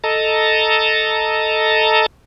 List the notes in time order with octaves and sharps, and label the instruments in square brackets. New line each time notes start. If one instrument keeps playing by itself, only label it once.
[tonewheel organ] A4 D#5 A5 A#5